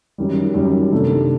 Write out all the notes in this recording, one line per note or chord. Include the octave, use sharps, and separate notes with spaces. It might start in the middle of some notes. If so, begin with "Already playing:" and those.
F#2 D#3 G3
F#2 D#3 G3
C3 D#3 A3 D4 A4